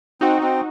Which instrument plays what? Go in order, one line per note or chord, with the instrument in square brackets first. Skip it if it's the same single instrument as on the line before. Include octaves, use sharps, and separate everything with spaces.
[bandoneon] C4 [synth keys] D#4 F#4
[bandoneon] C4 [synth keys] D#4